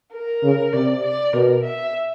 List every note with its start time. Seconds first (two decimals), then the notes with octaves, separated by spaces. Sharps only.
0.13 A#4
0.43 C#3
0.73 C3 D5
1.04 D5
1.34 B2 A#4
1.64 E5